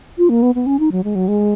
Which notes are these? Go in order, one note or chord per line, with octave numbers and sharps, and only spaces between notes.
F4
A#3
B3
B3
C#4
D#4
F#3
G#3
F#3
G#3